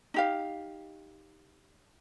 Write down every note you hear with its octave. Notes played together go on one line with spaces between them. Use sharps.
D#4 G4 F5